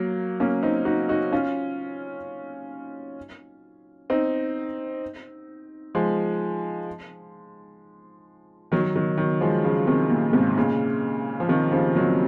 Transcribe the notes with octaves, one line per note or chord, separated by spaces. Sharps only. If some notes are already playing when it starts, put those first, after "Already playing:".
Already playing: F#3 A#3
A#3 C#4
C4 D#4
D#4 F#4
D#4 F#4
C#4 F4
C4 D#4
F3 G#3
D#3 F#3
D#3 F#3
D#3 F#3
F3 G#3
C#3 F3
C3 D#3
A#2
G#2 C3
A#2 C#3
F3
C3 D#3
C#3 F3
D#3 F#3